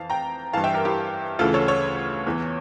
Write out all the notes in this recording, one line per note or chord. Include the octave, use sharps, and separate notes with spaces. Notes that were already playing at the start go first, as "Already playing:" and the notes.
Already playing: F2 E3 F5 A5
G5 A#5
G2 E3 F5 A5
E5 G5
G4 A#4
E4 G4
D2 C#3 E3 F4 A4
A4 C#5
A4 C#5
E2 E3